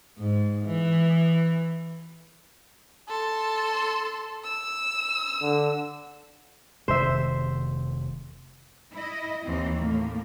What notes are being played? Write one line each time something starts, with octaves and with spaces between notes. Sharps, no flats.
G#2
E3
A4 C6
E6
D3
F1 C3 D#3 C5 E5
E4 D#5
D#2 E3 C4
A2 A#3